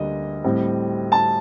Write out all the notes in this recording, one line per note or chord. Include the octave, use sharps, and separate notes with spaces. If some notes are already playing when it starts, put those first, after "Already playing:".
Already playing: D2 D3 G3 A#3 D#5
A2 G3 C4
A5